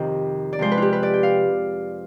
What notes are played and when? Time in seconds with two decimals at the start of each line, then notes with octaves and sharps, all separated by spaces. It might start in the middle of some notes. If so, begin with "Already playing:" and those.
Already playing: F2 C3 D#3 G4
0.53 D5
0.59 C3 F3 G#3 C5
0.72 B4
0.78 F4 G4
0.93 B4
1.03 D5
1.14 G5
1.23 F5